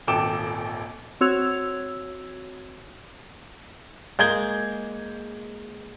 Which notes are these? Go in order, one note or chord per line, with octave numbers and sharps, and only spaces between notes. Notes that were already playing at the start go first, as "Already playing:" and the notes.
D#1 G#1 A4 G5 D6 E7
C4 F#4 C#5 E6 G#6 F7
G#3 A#3 G#4 G6 G#6 G7